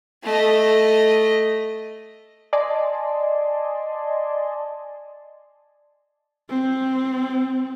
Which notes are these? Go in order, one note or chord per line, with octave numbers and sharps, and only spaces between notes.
A3 D#5
D5 D#5 G#5 A5 C6
C4